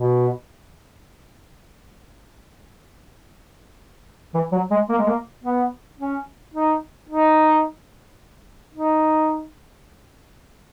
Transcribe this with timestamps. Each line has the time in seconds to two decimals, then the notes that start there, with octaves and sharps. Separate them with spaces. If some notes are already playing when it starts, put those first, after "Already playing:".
Already playing: B2
4.34 E3
4.52 F#3
4.70 G#3
4.89 A#3
4.98 G#3
5.07 A#3
5.44 B3
5.99 C#4
6.54 D#4
7.09 D#4
8.74 D#4